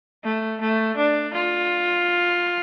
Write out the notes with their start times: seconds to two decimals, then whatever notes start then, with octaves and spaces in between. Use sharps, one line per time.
0.24 A3
0.61 A3
0.97 D4
1.33 F4